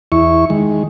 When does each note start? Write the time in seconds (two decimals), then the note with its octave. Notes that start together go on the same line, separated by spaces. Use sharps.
0.12 E2 E4 C#6
0.50 D#3 G#3